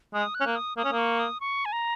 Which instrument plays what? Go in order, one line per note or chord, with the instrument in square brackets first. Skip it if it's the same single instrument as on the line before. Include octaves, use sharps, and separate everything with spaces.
[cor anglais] G#3 [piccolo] D#6
[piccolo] F#6
[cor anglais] C#4
A#3
[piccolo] D#6
[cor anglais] A#3 [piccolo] D#6
[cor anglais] C#4
A#3
[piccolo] C#6
D#6
C#6
G#5
A#5